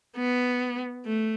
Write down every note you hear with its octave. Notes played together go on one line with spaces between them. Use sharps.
B3
A3